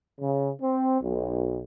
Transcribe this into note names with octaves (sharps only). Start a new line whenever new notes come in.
C#3
C4
B1